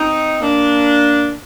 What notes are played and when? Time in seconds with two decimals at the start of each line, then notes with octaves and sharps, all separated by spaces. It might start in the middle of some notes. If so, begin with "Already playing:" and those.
Already playing: C4 D#4
0.41 A#3 D4